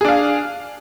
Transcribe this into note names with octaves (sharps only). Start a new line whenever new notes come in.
D4 G#4 F5